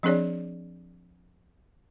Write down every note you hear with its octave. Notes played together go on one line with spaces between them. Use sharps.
F3 C4 D4 G#4 C#5 D5